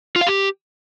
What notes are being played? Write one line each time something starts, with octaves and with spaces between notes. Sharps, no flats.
F4
F5
G4